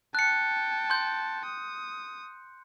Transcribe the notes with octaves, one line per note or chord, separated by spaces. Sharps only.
G5 A5 F#6 C#7
C6 G6
D#6